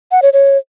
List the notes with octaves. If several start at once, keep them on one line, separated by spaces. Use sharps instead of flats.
F#5
C#5
C#5